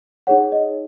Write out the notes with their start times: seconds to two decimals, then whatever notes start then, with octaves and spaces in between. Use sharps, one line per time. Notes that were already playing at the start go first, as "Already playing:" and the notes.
0.27 D#4 G#4 C#5 F#5
0.52 D#5